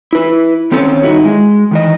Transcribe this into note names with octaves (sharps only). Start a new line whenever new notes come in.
E4 B4
D#3 C4 C#4 A4 C#5
G2 D#3 D#4 E4 F#4
G#3
D#3 E3 D#5